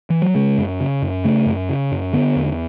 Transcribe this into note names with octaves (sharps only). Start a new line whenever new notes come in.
E3
F#3
C#3 G#3
F#2
C#3
F#2
C#3 A3
F#2
C#3
F#2
D3 B3
E2